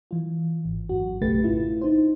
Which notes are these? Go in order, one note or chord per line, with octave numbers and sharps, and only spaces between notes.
E3 F4
G#1
G#1 F#2 F#4
B1 C#3 A3 G4 B4 A6
A1 E4 F4
D#4 C5